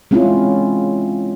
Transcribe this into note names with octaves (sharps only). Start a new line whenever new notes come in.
G#3 C4 C#4 E4 F4